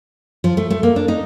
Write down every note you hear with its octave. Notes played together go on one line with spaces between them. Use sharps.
F3
A3
A3
A#3
D4
D#4